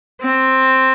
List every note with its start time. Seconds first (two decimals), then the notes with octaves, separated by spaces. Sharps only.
0.21 C4